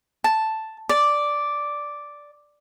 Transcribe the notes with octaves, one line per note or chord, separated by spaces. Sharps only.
A5
D5